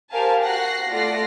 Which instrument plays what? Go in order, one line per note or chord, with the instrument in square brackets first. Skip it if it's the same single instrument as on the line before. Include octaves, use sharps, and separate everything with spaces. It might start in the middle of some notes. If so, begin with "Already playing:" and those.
[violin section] G4 A#4 C5 F5 G#5 A5
F#4 F#5 F#6 A#6 C7
A3 F4 D5 F#5 A#6 C7